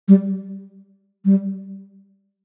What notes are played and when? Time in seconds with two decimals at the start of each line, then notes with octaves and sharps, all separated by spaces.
0.08 G3
1.25 G3